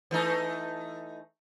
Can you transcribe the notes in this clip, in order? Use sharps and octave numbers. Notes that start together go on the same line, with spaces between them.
E3 A3 D#4